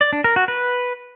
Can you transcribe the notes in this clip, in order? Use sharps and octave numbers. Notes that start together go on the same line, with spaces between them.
D5
D4
A#4
F#4
B4